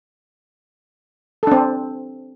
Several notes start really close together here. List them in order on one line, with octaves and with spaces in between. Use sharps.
A4 D4 C4